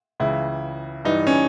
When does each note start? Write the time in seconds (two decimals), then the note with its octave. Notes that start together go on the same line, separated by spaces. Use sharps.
0.20 C#2 C#3 E3 E4
1.05 G2 E3 D#4
1.27 C#4